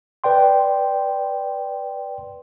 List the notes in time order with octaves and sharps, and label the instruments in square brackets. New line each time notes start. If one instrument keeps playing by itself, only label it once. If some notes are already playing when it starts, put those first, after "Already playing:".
[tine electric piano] B4 D5 G5 C6